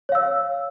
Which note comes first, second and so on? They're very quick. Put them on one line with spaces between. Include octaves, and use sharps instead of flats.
C#5 F5 E6